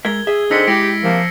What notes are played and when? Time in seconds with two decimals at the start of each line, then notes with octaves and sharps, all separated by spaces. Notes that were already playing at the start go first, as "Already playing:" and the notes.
0.05 G#3 A#4 E5 G#6 G7
0.27 G#4 E5
0.51 D3 C4 D#4 C5 E6 B6 C#7
0.67 G#3 E4 G4 A#6 C7 D7
1.04 C3 F3 A#3